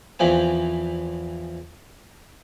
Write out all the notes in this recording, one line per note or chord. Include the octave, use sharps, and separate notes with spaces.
E2 E3 F3 C4 G#5